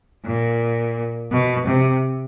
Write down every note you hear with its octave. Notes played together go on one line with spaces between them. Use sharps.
A#2
B2
C3